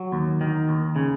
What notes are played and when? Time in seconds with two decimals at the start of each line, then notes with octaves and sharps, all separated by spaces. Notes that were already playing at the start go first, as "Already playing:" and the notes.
Already playing: F#3
0.12 D#2
0.41 D#3
0.69 D#2
0.96 C#3